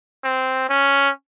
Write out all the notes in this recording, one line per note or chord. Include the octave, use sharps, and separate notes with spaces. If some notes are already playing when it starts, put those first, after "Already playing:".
C4
C#4